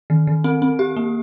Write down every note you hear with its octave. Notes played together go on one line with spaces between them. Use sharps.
D#3
D#3
C4
C4
G4
A#3